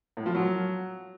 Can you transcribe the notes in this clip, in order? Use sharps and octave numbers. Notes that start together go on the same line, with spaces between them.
A2
F3
F#3